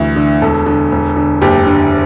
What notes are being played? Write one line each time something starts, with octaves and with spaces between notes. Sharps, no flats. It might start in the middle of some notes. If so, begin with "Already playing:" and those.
Already playing: D2 E3
D3
E1 A4
D3
E1
D3
F#1 G4
D3